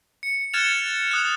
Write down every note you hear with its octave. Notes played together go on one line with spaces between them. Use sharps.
C#7
F6 F#6 G#6 A6 E7 F7
D#6 F#6